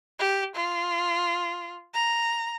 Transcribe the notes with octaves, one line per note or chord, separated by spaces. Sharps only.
G4
F4
A#5